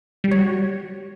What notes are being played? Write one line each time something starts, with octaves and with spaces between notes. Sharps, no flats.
G3
C#5
F#4
G3